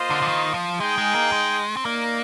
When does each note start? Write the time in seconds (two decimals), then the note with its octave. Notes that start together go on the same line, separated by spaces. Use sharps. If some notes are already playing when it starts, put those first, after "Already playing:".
Already playing: A#3 F4 C5 D#5
0.10 D3
0.22 D3
0.28 D#3
0.54 F3
0.80 G#3 D#4 G#4 D#5 G5
0.98 G#3
1.15 A#3
1.32 G#3
1.77 C4
1.84 A#3 D#4 A#4 D5